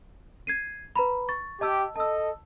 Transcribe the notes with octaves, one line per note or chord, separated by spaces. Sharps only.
G#6 C7 D#7
B4 A#5 B5
C#6 A6
G4 D#5 A5 E6
A4 D#5 A5 E6